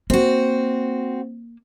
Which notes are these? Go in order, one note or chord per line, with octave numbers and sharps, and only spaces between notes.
A#3 C4 F#4